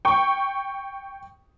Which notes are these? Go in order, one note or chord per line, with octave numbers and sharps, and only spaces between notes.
G5 C#6